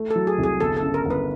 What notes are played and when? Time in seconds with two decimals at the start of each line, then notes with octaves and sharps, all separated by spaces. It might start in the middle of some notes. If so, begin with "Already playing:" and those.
Already playing: A3
0.11 A4
0.16 F#3
0.27 G#4
0.38 C2
0.44 G#4
0.60 G1 A4
0.77 A4
0.82 C#3
0.94 A#4
1.06 G1 B4